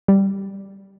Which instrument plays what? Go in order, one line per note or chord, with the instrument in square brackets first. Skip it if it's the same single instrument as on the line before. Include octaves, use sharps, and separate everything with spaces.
[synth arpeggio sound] G3